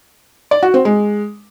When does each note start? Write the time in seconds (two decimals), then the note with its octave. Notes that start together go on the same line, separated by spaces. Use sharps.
0.51 D5
0.63 F#4
0.74 C4
0.85 G#3